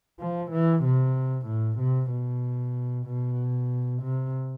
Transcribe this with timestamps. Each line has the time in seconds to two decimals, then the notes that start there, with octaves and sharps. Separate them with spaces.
0.20 F3
0.52 E3
0.83 C3
1.47 A2
1.79 C3
2.11 B2
3.06 B2
4.03 C3